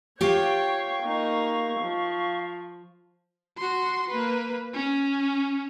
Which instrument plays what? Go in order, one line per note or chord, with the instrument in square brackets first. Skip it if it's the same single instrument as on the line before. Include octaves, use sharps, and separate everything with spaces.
[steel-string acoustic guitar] F4 G4 [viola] C#5 G5 [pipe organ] F5 C#6
[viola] A#3 D#4
F3
[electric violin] F#4 C6
A#3 B4
C#4